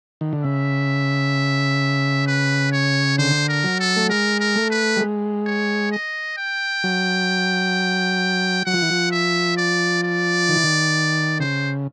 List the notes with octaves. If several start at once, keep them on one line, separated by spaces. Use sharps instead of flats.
D#3
D3
C#3 E5
B4
C#5
D3 C5
A#4
F#3
A4
A3
G#3 A#4
A#4
A3
B4
G3
G#3
C#5
D#5
G5
F#3
F#3 F#5
F3
E3
F3
E5
D5
D5
D#3
E3
D#3
C#3 C5